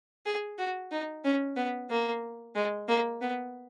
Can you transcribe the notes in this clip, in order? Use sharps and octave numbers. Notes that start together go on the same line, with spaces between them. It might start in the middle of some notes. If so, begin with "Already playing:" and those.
G#4
F#4
D#4
C#4
B3
A#3
G#3
A#3
B3